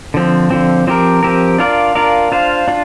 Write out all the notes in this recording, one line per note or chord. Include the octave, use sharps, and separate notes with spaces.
D3 F3 C4
D3 F3 C4
F3 C4 G4 A#4
F3 C4 G4 A#4
D4 F4 A#4 D5 F5
D4 F4 A#4 D5 F5
D4 F4 C5 F5
D4 F4